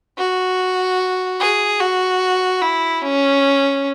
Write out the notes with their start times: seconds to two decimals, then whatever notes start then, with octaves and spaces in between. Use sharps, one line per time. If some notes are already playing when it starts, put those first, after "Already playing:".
0.18 F#4
1.40 G#4
1.80 F#4
2.62 E4
3.02 C#4